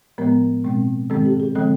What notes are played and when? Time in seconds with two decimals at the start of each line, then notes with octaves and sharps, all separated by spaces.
0.18 A2 F3 G#3 B3 A#4
0.64 B2 G#3 C4
1.10 G#2 D#3 G#3 C4 A4
1.26 G4
1.40 G#4
1.55 D3 F3 G#3 C4 A4